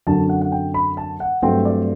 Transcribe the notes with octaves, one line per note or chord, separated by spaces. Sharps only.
F#2 D3 F#3 C4 A5
F#5
F#5
G5
B5
A5
F#5
G2 F#3 A3 C4 G5
D5